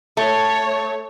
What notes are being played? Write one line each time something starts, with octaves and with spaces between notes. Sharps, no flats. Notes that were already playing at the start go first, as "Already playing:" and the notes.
A3 C#5